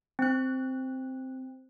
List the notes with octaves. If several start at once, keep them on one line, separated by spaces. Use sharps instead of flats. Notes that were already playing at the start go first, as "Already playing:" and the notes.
C4 F#6